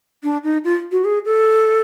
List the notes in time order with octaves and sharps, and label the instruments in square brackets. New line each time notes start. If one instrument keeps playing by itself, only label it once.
[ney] D4
D#4
F4
F#4
G#4
A4